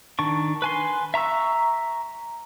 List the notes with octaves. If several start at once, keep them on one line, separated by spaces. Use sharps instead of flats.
D#3 D4 C#6
B4 G#5 C6
E5 A#5 C#6 E6